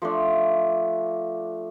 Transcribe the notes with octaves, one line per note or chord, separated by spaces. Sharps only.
F3 A3 D4